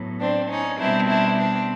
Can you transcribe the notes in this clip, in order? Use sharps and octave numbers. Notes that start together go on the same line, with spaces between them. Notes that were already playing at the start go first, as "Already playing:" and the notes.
Already playing: A2 F#3 B3
C4 D4
C#4 D#4
B2 G3 C4 D4 E4
D4 E4
C4 D4